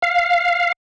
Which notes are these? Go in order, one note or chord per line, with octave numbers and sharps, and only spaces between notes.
F5